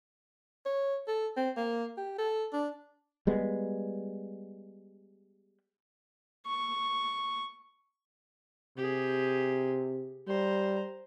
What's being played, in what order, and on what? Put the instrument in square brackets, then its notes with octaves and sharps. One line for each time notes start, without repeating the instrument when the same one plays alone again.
[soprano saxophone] C#5
A4
C4
A#3
G4
A4
D4
[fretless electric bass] G3 G#3 B3
[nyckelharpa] C#6
[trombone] C3 [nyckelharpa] G4 G#4
[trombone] G3 [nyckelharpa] C5 A#5